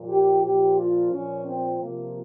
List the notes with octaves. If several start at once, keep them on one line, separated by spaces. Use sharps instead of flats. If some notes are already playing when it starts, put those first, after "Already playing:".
Already playing: A#2 F3
G4
A#2 F3 G4
F4
A#2 F3 C#4
C4
C3 F3 A#3